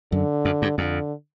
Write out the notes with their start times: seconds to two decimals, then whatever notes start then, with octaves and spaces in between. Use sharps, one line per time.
0.12 F#2 D3
0.45 F#2
0.62 G2
0.78 F2 D3